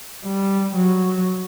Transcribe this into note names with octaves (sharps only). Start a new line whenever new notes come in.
G3
F#3